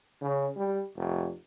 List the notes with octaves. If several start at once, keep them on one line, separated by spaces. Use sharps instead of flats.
C#3
G3
F1